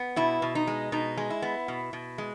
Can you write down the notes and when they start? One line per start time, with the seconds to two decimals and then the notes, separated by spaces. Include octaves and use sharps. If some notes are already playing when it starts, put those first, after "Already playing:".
Already playing: B3
0.16 B2 E4
0.42 B2
0.55 D#4
0.67 G#3
0.92 B2 D#4
1.17 G#3
1.30 E4
1.42 B3
1.68 B2
1.93 B2
2.18 G#3